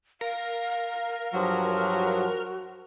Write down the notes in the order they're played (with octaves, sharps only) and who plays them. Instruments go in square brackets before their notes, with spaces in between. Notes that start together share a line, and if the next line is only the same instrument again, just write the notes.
[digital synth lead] A#4 [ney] F5
[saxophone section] G2 F3 F#3
[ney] F#4